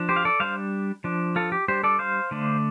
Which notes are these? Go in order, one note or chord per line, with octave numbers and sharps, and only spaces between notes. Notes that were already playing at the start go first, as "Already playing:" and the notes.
Already playing: F3 D4
G4 C5
F5
A4 D5
G3 D4 C5 F5
F3 D4
F4 A4
G4
G3 D4 G4 C5
A4 D5
C5 F5
D3 A3 D4